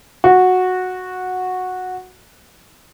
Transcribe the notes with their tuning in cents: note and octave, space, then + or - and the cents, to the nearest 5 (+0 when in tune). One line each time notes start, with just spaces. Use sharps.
F#4 -10